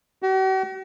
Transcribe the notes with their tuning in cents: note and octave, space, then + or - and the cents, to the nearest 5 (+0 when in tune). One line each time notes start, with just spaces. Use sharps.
F#4 +45